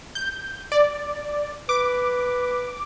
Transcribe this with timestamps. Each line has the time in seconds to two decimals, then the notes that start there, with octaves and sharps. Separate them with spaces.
0.15 G6
0.72 D5
1.69 B4 D6